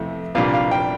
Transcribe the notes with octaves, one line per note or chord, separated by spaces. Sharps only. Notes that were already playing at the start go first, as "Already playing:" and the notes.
Already playing: F2 C3 E3 A3
C2 A#2 G3 D4 F5
F5
G5